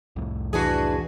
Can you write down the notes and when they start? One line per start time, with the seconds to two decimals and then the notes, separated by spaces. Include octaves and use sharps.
0.16 C2 F2 A2
0.53 E3 D4 F#4 G#4 B4 A5